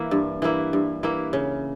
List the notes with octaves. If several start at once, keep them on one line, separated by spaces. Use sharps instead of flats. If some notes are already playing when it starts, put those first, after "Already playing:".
Already playing: E3 A#3 E4
G2
E3 A#3 E4
G2
E3 A#3 E4
C#3